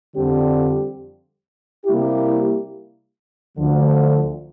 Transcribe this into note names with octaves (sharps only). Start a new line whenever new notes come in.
F2 D3 G3 C4 G4
C3 G3 A#3 E4 G4
D2 D3 F3